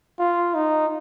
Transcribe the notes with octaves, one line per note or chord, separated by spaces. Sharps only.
F4
D#4